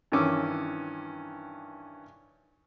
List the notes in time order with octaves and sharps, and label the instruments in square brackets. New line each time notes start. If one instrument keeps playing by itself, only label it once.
[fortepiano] G2 D#3 E3 C#4 D6 E6